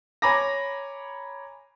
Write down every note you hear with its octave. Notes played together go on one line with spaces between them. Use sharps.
C#5 G#5 A#5 B5 D6 A#6